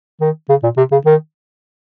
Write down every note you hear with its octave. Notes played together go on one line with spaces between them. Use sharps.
D#3
C#3
A#2
C3
C#3
D#3